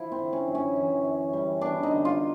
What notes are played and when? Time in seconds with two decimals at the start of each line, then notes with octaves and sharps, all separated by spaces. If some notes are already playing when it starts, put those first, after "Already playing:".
Already playing: F3 E4
0.12 C4
0.19 D3
0.33 C#4
0.48 F#2
0.55 C#4
0.76 E3
1.05 F#2
1.33 G3
1.61 B3 D4
1.83 D#4
1.91 D3
2.05 F4